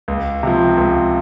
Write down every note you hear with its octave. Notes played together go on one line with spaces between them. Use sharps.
C#2
C3 F3
C#2